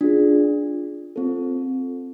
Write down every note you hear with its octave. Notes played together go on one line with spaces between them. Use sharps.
D4 F4 G#4
C4 F4 A4